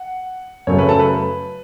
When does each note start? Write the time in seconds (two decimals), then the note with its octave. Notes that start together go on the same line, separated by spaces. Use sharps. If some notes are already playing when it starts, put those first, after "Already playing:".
Already playing: F#5
0.67 F#2 C#3 F#3 A3 C#5
0.79 B4
0.89 A4
0.99 B4